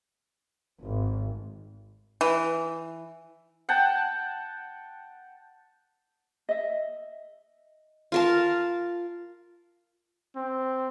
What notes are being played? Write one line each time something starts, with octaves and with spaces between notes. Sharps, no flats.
G#1
E3
F#5 G5 A5
D#5 E5
F4 A#4 A5
C4